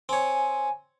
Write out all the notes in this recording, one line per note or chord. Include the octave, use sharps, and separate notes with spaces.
C4 C#5 G#5